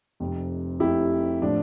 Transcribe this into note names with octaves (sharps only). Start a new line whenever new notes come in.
F1 F2 C3
F1 F2 C3 E4 G4
A2 F3 D4